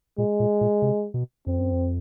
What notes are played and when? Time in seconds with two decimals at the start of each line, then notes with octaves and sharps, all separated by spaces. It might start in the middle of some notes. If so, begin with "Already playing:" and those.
0.18 A#2 G#3
0.40 A#2
0.61 A#2
0.82 C3
1.14 B2
1.47 F2 C4
1.59 F#2
1.72 F2